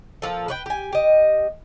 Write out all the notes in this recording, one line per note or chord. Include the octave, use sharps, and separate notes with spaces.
A#2 C#3 F3 A4
B4 C#5 G5
G4 G#5
G4 D#5